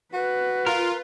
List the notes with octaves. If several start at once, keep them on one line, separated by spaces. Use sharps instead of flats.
F#4 B4
F4 A#4